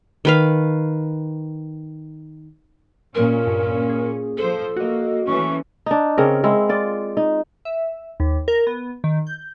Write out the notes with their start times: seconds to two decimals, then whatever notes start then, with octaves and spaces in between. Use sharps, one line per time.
0.25 D#3 B4 F5
3.15 A#2 G#3 C#4 A#4
3.44 C#2 G2
3.89 G#4
4.37 F3 A4 C5
4.77 A#3 F#4 D#5
5.27 E3 A3 C#4 C#6
5.86 D4 D#4
6.18 C#3 C4 C#4 A#4
6.44 G#3 C4 E4
6.69 F4 D5
7.17 D#4
7.65 E5
8.20 D#2
8.48 A#4
8.67 B3
9.04 D#3
9.27 G6